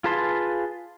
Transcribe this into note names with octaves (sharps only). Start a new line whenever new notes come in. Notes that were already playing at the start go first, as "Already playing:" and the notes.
F4 G#4 B4 A5 C6